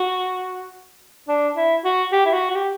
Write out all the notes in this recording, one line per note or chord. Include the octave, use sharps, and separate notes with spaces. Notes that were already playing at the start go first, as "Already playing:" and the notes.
Already playing: F#4
D4
E4
F#4
G4
E4
F#4
F#4
G4